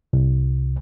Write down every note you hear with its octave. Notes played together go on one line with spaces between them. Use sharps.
C2